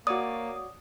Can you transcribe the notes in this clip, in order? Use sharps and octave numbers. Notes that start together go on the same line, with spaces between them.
A#3 F#4 C#5 D5 D#6